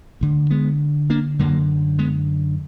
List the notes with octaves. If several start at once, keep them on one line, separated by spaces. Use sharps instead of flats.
D2 D3
G#3 B3
A#3 D4
F#2 D3 F#3 A#3
G#3 B3